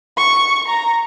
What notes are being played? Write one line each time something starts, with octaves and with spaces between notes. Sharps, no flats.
C#6
A#5